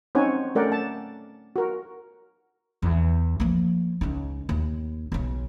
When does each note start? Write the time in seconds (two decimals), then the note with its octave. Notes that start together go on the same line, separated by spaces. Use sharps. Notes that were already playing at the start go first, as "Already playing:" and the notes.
0.15 C4 C#4 D#4 C#5 F#5 G#5
0.55 A3 C#4 A#4 D5 F#5 G5
0.72 A5
1.56 F#4 A#4
2.82 E2
3.40 F3 A#3
4.01 C#2 D#4
4.49 D#2
5.12 B1 C#3